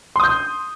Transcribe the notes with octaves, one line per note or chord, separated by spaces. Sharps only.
C6 D#6 G6